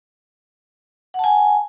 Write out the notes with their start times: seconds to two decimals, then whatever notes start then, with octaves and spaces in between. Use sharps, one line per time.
1.14 F#5
1.19 A5
1.24 G#5